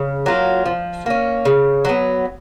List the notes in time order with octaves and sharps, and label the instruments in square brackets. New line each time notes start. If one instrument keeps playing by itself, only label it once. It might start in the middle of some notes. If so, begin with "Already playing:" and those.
Already playing: [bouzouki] C#3
F#3 A#3 F4
F3
A#3 C#4
C#3
F#3 B3